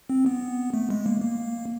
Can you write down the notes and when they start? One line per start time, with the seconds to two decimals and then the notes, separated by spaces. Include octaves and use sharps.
0.10 C4
0.26 B3
0.74 A3
0.90 G#3
1.06 A#3
1.22 A#3